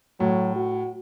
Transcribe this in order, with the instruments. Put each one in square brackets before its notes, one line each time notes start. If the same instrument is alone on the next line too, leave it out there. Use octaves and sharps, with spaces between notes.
[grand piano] A2 [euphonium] F#3
[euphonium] F#4